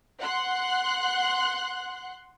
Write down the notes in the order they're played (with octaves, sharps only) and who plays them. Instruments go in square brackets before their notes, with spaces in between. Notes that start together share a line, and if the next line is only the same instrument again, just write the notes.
[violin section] F#5 C6 F#6